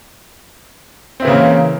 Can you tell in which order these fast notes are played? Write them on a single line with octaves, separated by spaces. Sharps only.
C4 E4 E3 C#3 A#3